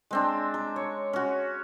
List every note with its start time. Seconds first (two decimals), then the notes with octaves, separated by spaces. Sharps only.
0.11 G#3 C4 D4
0.54 A#5
0.76 C#5
1.13 C#4 F#4